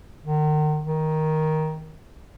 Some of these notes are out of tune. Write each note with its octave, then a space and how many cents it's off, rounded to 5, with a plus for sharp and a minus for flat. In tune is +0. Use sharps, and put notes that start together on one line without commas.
D#3 -35
D#3 +10